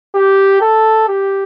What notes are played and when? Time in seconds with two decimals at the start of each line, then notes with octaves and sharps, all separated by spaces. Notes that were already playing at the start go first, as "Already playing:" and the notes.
0.15 G4
0.61 A4
1.08 G4